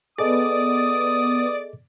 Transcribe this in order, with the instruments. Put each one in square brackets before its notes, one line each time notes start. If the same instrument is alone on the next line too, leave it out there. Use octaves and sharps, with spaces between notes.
[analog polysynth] B3 [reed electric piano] G#4 A4 D#5 [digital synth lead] D5 [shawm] D#6